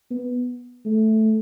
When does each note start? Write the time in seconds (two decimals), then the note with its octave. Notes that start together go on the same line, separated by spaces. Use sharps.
0.11 B3
0.86 A3